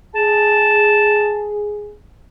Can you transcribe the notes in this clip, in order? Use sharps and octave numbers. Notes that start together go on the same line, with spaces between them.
G#4 A5